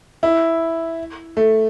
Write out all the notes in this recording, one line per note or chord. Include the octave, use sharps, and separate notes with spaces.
E4
A3